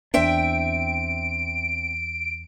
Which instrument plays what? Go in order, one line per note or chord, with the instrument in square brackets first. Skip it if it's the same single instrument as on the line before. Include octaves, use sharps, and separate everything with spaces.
[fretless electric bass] E2 D4 [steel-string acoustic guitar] C4 E5 G5 [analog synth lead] D7